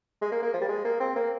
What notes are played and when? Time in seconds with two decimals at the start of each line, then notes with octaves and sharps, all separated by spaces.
0.22 G#3
0.32 A#3
0.42 A#3
0.54 F3
0.61 G3
0.69 G#3
0.85 A#3
1.00 C4
1.16 A#3